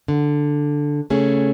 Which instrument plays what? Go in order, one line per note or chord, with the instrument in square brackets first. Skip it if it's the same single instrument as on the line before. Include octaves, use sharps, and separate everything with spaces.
[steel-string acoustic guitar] D3
C#3 A3 C#4 G#4